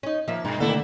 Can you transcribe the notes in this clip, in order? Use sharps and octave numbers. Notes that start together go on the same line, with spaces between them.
C#4 D#4
F3 A#3 E5
G2 B2
D3 D#3 A3 A#3 E4 A4